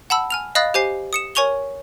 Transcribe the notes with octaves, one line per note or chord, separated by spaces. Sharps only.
F#5 A5 B5 E6
G#5 F6 F7
D#5 F5 B5 D#6 F#6 A6
G4 C5 G#5 C7
D#6 C#7 E7
A#4 C#5 G#5 C#6 F7 G7